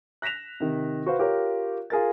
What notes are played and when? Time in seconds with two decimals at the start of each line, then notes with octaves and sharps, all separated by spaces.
0.22 F#6 A#6 B6 E7 F7
0.60 C3 D#3
1.06 F#4 B4 C5 F5 F#5
1.19 F4 G4 A#4 C#5
1.90 F4 G#4 A#4 A6